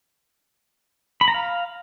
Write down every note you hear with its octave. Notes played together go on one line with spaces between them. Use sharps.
B5
A#5
F5